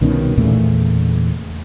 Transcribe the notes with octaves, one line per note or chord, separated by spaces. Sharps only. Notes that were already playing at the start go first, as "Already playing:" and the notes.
C2 B2 D#3 C#4
E2 A#2 C#3 A3